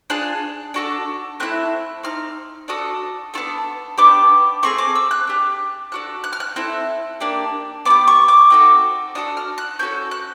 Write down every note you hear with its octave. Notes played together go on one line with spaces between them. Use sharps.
D4 F4 G#4 F#6
D4 F#4 A4
A3 C4 E4 F#6
C4 D#4 F6
D4 F#4 A4 D#6
B3 D4 F4 A4
B3 D4 G4 D6
A3 C4 G#4 C#6
D6
E6
F#6
D4 G4
D4 F#4 A4 F#6
F#6
F6
F#6
C4 E4 A4 F#6
A#3 D4 G4
B3 D4 G4 D6
C#6
D6
C4 D#4 F#4 A4
D4 F#4 A4 D#6
F6
F#6
A3 C#4 F#4 A4 G6
F#6